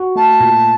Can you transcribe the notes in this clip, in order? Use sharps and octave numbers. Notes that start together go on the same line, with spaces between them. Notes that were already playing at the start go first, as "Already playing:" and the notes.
Already playing: F#4
A3 A5
A#2